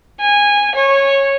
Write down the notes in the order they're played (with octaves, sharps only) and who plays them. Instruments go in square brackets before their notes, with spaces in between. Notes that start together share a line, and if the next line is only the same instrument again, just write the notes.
[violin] G#5
C#5